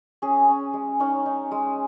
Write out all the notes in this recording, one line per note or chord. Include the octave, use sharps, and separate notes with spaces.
C#4 G#4
C#4
G#3
C#4 D#4 C#5
D#4
G#3